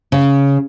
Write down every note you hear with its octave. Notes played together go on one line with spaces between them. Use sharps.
C#3